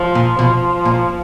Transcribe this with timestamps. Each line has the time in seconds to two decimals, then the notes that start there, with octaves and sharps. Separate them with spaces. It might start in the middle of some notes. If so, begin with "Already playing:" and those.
Already playing: F3
0.15 A#2
0.39 B2 F3
0.85 A#2